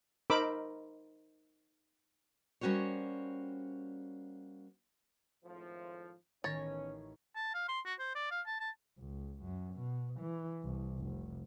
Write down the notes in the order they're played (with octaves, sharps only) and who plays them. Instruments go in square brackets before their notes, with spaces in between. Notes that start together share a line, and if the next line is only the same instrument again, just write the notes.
[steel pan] D#4 A#4 C5 B5 D6 E6
[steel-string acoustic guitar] G3 A#3 C#4 F#4 C5 C#5
[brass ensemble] G#1 A2 F3
[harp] A1 D#3 C#6 [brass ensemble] B3 C#4 [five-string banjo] C#5 [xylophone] A6 A#6
[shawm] A5
F5
C6
F#4
C5
D5
F5
A5
A5
[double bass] C#2
F#2
B2
E3
C2
F1